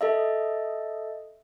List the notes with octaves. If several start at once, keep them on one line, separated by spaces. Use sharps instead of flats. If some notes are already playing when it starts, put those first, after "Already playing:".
A4 D#5 E5